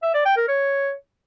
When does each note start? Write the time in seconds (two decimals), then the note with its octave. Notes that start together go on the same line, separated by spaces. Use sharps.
0.03 E5
0.14 D5
0.26 G5
0.37 A#4
0.48 C#5